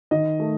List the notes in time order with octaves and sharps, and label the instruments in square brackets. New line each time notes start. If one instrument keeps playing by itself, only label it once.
[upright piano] D#3 D#5
A3